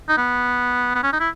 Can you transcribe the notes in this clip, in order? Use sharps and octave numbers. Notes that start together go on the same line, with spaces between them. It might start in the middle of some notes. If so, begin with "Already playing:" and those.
D#4
B3
B3
C#4
D#4
E4